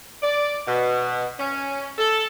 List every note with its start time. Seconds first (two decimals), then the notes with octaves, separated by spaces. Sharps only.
0.22 D5
0.67 B2
1.38 C#4
1.98 A4